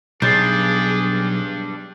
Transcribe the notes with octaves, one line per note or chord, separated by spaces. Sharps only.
B1 G3 D4 G#4 G6 A6 C7